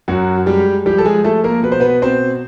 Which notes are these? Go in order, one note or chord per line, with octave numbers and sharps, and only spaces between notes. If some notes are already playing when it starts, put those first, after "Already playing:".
F#2 F#3 F#4
G3 G#3 G4
F3 G3 G4
A4
G#3 G#4
F3 A3 A4
A#3 A#4
B2 B4
C5
B3 B4
B2 C4 C5